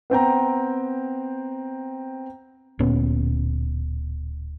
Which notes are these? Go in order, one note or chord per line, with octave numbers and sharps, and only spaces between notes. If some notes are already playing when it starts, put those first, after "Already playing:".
B3 C4 G5 A#5
D1 A#2 B3 C#4